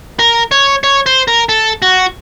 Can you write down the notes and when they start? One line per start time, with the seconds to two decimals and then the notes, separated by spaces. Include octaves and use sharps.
0.19 A#4
0.51 C#5
0.84 C#5
1.06 C5
1.28 A#4
1.49 A4
1.82 F#4